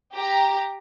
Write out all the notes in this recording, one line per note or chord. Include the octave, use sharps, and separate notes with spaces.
G4 A#5